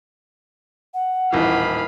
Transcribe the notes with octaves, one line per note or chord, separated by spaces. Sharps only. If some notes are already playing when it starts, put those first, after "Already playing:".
F#5
D#1 A2 E3 A#3 D#4 F5 B5